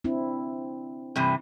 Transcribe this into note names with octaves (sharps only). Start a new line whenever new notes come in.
C4 D4 E4
G2 C3 E3